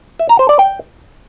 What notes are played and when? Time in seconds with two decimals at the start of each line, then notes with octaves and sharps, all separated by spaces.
0.19 E5
0.29 A#5
0.39 C5
0.49 D5
0.59 G5